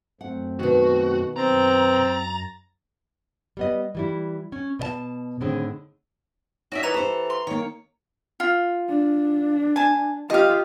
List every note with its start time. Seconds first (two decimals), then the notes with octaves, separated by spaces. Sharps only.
0.21 F#2 A3 C4 F#5
0.60 B2 D#3 F#4
1.36 F#2 C4 A#5 A6 A#6
3.57 G3 B3 D#5
3.95 E3 G3 E4
4.52 C#4
4.79 B2 D#5 A5
5.41 A2 D3 D#3 C4 G#4
6.72 C#4 D#4 F#4 D5 E5
6.83 E3 B4 C#5 D#5 A#5 F7
6.94 G4 A4 C5
7.30 C6
7.47 D#3 A#3 C#5
8.40 F4
8.89 D4
9.76 G#5 A5
10.30 F4 G4 D#5 F5